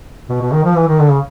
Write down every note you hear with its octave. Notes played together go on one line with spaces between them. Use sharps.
B2
B2
D#3
F3
E3
D#3
D3
C#3